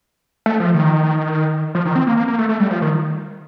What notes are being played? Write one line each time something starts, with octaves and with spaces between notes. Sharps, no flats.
A3
F3
D#3
F3
D#3
C4
A#3
A#3
A#3
A3
A3
G3
F3
D#3